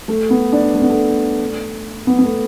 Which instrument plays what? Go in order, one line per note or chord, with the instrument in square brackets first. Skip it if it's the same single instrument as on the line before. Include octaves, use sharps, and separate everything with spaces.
[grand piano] A3
B3
D4
A3
B3
A3
B3
B3
A3